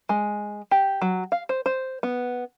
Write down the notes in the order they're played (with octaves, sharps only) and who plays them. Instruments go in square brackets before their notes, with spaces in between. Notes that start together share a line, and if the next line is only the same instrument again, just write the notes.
[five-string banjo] G#3
G4
F#3
F5
C5
C5
B3